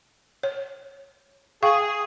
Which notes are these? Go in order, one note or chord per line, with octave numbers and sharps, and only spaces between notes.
C#5
G#4 F5 G5 C#6